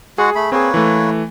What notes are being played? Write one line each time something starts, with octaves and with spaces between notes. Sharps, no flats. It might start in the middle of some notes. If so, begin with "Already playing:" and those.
G#3 F#4 G#4 F#5
A3 B5
A#3 C4 G#4 B4 C#5
E3 A3